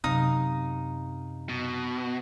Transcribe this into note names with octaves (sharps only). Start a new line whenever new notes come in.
F#2 C3 D#4 F5 D#6
B2